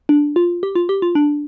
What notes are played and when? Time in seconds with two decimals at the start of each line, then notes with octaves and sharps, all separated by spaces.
0.09 D4
0.36 F4
0.63 G4
0.75 F4
0.89 G4
1.02 F4
1.15 D4